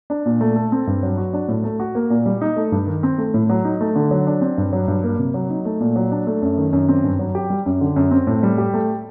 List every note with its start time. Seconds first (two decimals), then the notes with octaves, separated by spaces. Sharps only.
0.10 D4
0.25 A#2
0.41 A3
0.56 A4
0.72 C4
0.87 G2
1.03 F#3
1.18 F#4
1.33 D4
1.48 A2
1.64 A3
1.80 F#4
1.95 A#3
2.10 A#2
2.26 G3
2.41 D#4
2.56 A3
2.72 G2
2.87 D#3
3.03 C4
3.18 A3
3.34 A2
3.49 F#3
3.65 D#4
3.81 A3
3.95 D3
4.11 F#3
4.27 D4
4.41 C4
4.58 G2
4.73 F#3
4.88 G2
5.03 A#3
5.19 C3
5.34 F#3
5.50 D#4
5.65 A3
5.80 A#2
5.96 F#3
6.12 D4
6.27 A3
6.42 F#2
6.57 D#3
6.73 F#2
6.88 C4
7.04 G2
7.19 F#3
7.35 G4
7.50 G3
7.66 F#2
7.81 D3
7.96 F#2
8.11 C4
8.27 A2
8.43 G3
8.58 G4
8.74 A3